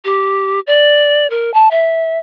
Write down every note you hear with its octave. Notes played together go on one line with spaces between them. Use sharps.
G4
D5
A#4
A5
E5